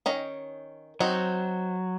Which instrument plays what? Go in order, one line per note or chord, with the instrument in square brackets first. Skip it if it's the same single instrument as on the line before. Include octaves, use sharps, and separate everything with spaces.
[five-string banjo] D#3 C#4 D#5
[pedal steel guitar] F#3 [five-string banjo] C4 D#4 F#4